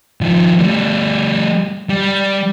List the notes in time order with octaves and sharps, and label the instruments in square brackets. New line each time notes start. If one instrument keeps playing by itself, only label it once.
[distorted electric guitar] D#3 F3
G3 A3
G3